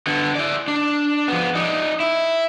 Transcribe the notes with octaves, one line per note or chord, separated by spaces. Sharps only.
D3 B3
E4 D5
D4
F3 B3
D#4 D5
E4